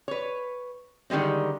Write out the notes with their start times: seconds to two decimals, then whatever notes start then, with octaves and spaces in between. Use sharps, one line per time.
0.08 B4 C#5
1.10 D3 D#3 G3 G#3 C4